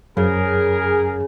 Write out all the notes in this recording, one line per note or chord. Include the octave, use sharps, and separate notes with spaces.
F#2 C#3 G#4 A#4